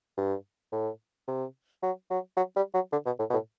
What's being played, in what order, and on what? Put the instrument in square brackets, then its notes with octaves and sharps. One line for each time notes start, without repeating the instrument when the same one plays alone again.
[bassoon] G2
A2
C3
F#3
F#3
F#3
G3
F#3
D3
B2
A2
B2
A2